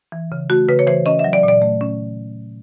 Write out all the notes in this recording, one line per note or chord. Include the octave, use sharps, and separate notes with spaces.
E3
C#3
A3 F#4
C#3 B4
C#5
E3 C5
C#4 D#5
E5
F#3
D5
A#2 D5
A3
C#4